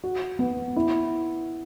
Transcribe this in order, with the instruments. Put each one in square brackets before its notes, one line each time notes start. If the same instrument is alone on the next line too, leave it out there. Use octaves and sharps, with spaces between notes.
[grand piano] F#4
B3
E4